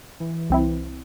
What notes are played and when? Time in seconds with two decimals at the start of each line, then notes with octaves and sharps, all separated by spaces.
0.20 E3
0.50 C2 C4 E4